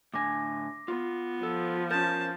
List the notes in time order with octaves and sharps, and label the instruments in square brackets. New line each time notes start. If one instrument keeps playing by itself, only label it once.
[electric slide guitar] A2 D3 G#5 [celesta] D6 A#6
[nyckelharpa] B3 [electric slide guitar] F4
[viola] F3 [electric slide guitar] A4
[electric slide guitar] C#4 A#4 [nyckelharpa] A5 [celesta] G6